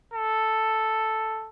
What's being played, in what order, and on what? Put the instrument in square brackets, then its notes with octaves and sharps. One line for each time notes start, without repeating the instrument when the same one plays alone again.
[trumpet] A4